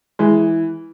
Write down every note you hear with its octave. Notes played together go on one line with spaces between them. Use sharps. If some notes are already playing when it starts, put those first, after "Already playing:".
E3 G#3